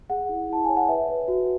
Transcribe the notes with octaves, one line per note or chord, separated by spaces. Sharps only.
G#4 F#5
E4
E4 A5
C#5 G#5
F#5
B4 E5
B4
F#4